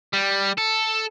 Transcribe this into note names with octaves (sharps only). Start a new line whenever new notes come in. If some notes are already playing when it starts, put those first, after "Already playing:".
G3
A4